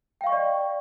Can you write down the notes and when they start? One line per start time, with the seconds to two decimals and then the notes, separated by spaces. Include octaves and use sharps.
0.21 G5
0.24 F5
0.27 C#6
0.30 D#5
0.32 D5